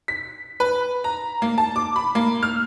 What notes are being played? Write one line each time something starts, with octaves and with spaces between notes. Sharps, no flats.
B6
B4
A#5
A#3
A5
D6
B5
A#3
F6